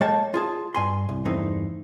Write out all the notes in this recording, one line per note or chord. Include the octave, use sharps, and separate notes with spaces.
G#3 A#3 A4 C#5 G5 A5
F4 G#4 A5
G2 G#5 C6
C2
E2 G2 E3 A3 C4 D#4